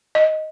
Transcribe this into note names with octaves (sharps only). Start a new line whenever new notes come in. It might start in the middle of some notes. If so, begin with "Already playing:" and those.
D#5